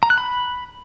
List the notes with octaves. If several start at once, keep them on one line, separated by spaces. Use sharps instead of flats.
A#5
F#6
B5